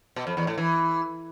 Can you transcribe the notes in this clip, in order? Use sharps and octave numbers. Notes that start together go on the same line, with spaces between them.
B2
F2
E2
A2
E3